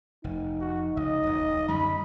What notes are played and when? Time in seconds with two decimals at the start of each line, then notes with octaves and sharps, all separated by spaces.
0.24 F1 D#4
0.60 F#4
0.97 C#2 D#5
1.26 D#1
1.68 F#2 D3 G3 B5